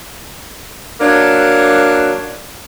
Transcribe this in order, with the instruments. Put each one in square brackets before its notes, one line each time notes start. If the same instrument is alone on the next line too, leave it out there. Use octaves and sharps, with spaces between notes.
[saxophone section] F#3 A#3 D4